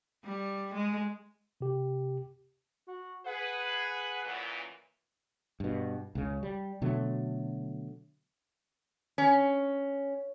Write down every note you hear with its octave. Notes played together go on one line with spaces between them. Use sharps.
G3
G#3
C3 G4
F#4
G#4 B4 F#5
F#2 A#2 E3
G2 B2
C#2 C#3
G3
B2 D3 F#3 A3
C#4